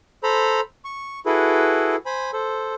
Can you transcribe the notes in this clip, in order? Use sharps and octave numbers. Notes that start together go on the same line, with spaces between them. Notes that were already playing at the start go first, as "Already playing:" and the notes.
A4 C5 A#5 B5
C#6
E4 F#4 G#4 A4 B4
C5 G#5 B5
A4 C5